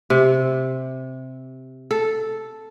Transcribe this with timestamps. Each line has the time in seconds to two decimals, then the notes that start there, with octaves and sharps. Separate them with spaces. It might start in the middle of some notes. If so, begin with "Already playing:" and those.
0.10 C3
1.91 A4